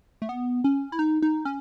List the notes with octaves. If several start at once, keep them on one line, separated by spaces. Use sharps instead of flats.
A3
B3
C#4
E4
D#4
D#4
C#4